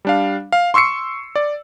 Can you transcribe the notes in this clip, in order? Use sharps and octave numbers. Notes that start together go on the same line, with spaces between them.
G3 D4 F5
F5
C6 C#6 E6 C7 C#7
D5